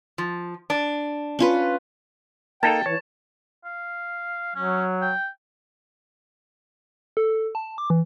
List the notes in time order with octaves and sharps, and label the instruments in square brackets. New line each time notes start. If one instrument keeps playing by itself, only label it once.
[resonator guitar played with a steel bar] F3
D4
[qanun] C#4 F4 B4
[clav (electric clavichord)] A#3 D#4 A4 [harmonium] G5 [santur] A5
[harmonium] E3 [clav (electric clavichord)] C#5
[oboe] F5
[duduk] F#3 [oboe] C#4
[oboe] G5
[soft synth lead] A4
A5
D6
E3